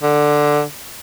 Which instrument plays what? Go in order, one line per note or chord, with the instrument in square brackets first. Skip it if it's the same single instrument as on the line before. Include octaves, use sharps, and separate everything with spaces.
[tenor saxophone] D3